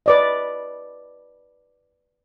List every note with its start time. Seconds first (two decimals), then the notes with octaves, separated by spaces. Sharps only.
0.06 B4 D5 D#5